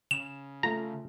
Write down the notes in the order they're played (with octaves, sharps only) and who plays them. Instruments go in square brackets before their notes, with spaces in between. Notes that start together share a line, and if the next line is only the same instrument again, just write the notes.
[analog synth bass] C#3 [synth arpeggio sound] E7
[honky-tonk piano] A3 F4 [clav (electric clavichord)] A#5